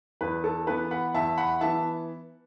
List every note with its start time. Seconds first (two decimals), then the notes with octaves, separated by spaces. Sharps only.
0.21 E2 B4
0.44 A4
0.67 E3 B3 B4
0.91 F#5 B5
1.14 E2 E5 A5
1.38 F#5 B5
1.61 E3 B3 E5 A5